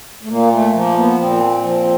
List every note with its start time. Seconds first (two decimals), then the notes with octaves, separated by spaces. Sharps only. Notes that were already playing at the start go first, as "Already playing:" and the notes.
0.23 A3
0.29 A#2 A#3
0.51 A3
0.73 F3 A#3
0.97 B3
1.18 A#2 C4
1.63 F3